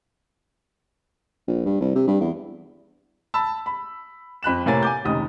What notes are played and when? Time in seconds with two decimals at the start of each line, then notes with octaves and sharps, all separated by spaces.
1.48 A#1
1.65 G2
1.81 C2
1.95 C3
2.07 G2
2.21 E2
3.34 A5 B5 E6
3.66 B5
4.43 F2 B5 F#6 E7
4.66 A2 C3 A#3 C#5 G#5 A6
4.83 G#5 D6 G6
5.05 F1 C#2 D#3 D#6